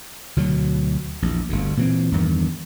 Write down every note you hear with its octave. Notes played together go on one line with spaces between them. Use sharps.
D2 B2 F#3
A#1 E2
G1 D2
A#2 E3 C4
E2 G2 D#3